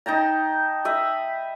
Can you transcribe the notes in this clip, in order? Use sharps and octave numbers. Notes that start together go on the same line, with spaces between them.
D#4 G5 A5 A#5
D#5 E5 B5